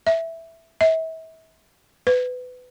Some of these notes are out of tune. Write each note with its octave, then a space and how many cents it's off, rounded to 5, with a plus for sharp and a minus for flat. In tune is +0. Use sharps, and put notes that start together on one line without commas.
E5 +0
E5 -35
B4 +25